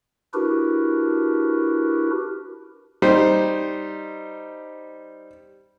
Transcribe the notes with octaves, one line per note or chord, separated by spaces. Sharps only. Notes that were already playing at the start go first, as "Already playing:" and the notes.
D4 E4 F#4 G4 A#4 B4
G3 D#4 C5